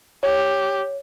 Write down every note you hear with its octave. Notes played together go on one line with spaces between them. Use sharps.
G4 C#5